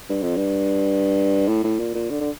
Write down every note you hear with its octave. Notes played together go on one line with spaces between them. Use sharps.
G2
F2
G2
A2
A2
A#2
A#2
D3
D3